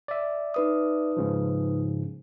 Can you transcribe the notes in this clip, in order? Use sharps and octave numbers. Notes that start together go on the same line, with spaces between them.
D5 E5
D#4 B4 D#6
G#2 C#3 F3